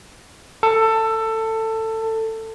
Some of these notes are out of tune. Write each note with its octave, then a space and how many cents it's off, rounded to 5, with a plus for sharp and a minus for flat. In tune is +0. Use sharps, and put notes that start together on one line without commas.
A4 +20